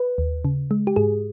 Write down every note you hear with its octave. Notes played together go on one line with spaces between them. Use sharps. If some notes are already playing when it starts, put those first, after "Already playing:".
Already playing: B4
D#2
C#3
G#3
G4
G#2 G#4